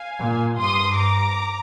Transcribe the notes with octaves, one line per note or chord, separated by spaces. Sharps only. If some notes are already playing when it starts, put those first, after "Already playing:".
Already playing: F5 G#5
A#2
G2 C6 D#6
A#5 D6